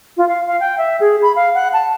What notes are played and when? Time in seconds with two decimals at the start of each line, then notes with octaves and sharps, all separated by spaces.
0.17 F4
0.29 F5
0.47 F5
0.60 G5
0.78 E5
1.00 G#4
1.22 B5
1.36 F5
1.54 F#5
1.73 A5